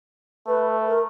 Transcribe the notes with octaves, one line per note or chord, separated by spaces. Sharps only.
A3 B4
A#4